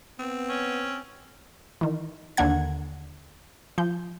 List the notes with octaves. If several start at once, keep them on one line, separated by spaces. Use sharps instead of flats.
B3 C4
C#4
D#3 E3
D#2 D3 A#3 F#5 G#6
F3 G6